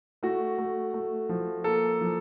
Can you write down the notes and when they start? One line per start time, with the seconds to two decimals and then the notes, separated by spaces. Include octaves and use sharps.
0.23 A3 F#4
0.58 A3
0.94 A3
1.29 F3
1.64 A#3 A4
2.01 F3